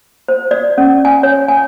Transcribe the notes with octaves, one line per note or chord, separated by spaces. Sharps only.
C5
D5
C#4
G#5
C#5
G#5